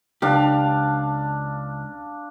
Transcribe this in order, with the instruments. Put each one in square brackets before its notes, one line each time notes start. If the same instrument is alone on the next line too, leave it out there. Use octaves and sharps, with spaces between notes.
[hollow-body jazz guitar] C#2 G4 [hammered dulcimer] D4 F5 A5